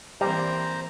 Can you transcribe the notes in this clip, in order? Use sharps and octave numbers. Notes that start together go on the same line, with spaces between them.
E3 G3 A#3 C4 C5 A#5